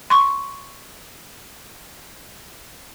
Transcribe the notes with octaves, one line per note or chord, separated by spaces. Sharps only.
C6 C#6